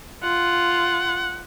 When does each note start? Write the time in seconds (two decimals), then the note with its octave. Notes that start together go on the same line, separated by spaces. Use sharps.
0.23 F4 F#5